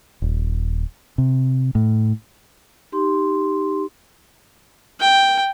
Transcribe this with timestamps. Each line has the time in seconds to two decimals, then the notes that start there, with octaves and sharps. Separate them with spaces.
0.22 D#1
1.18 C3
1.75 A2
2.92 D#4 G4 C6
5.01 G5